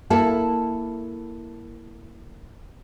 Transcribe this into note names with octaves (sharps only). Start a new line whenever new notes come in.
A#3 E4 A4